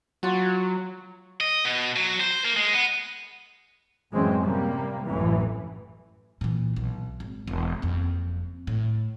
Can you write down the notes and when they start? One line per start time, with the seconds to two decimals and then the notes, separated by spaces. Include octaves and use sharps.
0.23 F#3 F4 F#4
1.41 D#5
1.65 B2
1.96 F#3
2.20 C5
2.45 A#3
2.57 G#3
2.73 B3
4.11 A1 F#2 E3 G#3 C4 C#4
4.45 C3 G3 A#3
5.04 A1 F#2 E3
6.41 A#2 E3
6.76 B1
7.20 G#1
7.47 E1
7.82 F#1 F2
8.67 A2